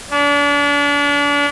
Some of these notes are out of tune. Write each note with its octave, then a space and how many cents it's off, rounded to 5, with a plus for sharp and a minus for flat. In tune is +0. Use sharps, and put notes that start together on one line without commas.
D4 -35